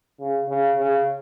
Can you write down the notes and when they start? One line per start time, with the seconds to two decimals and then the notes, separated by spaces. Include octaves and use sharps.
0.20 C#3
0.49 C#3
0.78 C#3